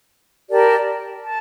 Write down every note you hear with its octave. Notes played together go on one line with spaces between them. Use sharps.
G4 A#4 D5 A5
A5